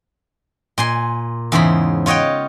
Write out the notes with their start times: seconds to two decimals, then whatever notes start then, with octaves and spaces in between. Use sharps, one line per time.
0.78 A#2 G#5 C6
1.52 E2 G#2 C#3 C5 B5
2.06 F4 C#5 D#5 F#5 G5